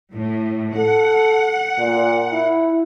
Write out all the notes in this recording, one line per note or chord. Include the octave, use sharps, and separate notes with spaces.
A2
A4 F#5
A#2
E4